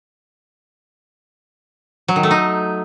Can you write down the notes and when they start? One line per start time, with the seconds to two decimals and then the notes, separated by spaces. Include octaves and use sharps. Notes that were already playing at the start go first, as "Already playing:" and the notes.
2.08 F#3
2.16 D#3
2.23 A3
2.31 D#4